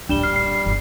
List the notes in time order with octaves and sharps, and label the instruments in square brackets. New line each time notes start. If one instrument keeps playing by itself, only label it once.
[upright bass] D1 A#1 [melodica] G3 [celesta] D4 E7 G7
[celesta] F6 [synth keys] C7
[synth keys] C7
[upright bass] G1 E2